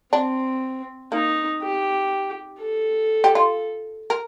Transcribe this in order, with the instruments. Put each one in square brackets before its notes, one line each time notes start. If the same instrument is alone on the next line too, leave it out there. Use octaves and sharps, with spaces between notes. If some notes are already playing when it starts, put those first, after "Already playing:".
[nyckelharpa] C4 [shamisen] D4
[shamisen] A#3 [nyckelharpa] D#4
[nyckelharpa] G4
A4
[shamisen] G4
F4
A#4